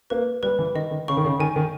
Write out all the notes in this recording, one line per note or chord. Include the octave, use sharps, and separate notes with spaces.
A#3 B4
G3 B4
E3
D#3 D#5
D#3
C#3 C#6
D#3
C#3
D#3 G#5
D#3